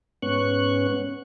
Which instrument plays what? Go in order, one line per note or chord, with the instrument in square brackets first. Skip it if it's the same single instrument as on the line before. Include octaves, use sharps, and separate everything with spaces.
[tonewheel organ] G#2 B3 C#4 C#6 F#6